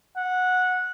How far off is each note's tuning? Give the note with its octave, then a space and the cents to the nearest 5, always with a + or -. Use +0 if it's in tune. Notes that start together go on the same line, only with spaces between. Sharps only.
F#5 -15